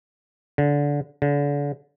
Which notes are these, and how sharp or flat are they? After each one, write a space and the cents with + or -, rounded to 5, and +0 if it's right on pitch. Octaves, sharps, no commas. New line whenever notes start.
D3 -20
D3 -35